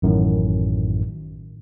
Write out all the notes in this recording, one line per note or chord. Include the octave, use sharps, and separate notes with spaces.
A1 F#2 A2 D#3